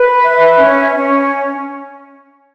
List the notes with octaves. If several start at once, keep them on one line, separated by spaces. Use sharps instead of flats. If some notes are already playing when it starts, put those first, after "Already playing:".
Already playing: B4
E5
C#4
C#4